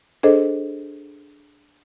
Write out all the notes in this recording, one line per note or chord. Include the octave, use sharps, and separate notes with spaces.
D4 G#4 A4 C5 D#5